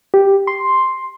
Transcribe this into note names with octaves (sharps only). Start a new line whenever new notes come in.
G4
C6